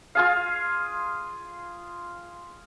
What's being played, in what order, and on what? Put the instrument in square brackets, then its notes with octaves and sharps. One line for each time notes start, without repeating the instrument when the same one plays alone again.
[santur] F4 G#4 F5